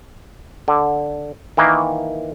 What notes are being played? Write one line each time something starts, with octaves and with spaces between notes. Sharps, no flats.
D3
D#3 E3 A#3